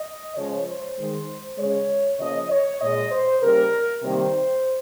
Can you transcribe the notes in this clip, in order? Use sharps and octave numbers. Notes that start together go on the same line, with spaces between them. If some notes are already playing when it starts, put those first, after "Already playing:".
Already playing: D#5
C#3 F3 G#3 C#5
C5
D#3 G#3
C#3 G#3 C#5
C#3 F3 A#3 D#5
C#5
A#2 G#3 D#5
C5
C#3 G3 A#3 A#4
C3 D#3 G3 A#3 C5